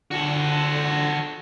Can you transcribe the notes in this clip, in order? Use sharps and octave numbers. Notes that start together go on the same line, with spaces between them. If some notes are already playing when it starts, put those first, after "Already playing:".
D3 F#4 A4